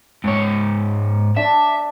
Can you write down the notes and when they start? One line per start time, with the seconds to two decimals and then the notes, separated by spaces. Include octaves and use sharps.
0.24 G#2 C#5
1.37 D4 D5 E5